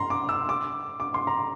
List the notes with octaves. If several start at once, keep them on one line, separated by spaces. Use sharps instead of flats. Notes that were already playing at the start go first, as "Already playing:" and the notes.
Already playing: A#5 C6
D6
E6
D6
D6
C6
A#5